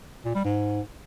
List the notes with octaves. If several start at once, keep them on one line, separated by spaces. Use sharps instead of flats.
A#2
G3
G#2